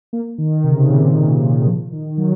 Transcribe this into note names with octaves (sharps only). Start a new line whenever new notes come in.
A#3
D#3
C3
C#3
C3
A#2
A#2
A#2
D#3
F3
D#3
F#3